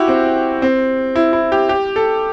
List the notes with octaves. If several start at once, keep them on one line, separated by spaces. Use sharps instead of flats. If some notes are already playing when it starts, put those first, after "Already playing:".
Already playing: E4 F#4 G4
C4
C4
E4
E4
G4
G4
A4